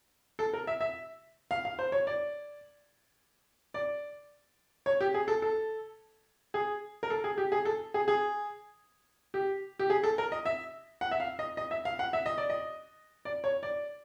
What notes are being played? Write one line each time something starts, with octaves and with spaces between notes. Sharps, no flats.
A4
A#4
E5
E5
F5
F5
C5
C#5
D5
D5
C#5
G4
G#4
A4
A4
G#4
A#4
A4
G#4
G4
G#4
A4
G#4
G#4
G4
G4
G#4
A4
A#4
D#5
E5
F#5
E5
F5
D#5
D#5
E5
F5
F#5
E5
D#5
D5
D#5
D5
C#5
D5